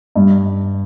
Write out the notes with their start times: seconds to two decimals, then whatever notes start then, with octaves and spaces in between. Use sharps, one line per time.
0.16 G2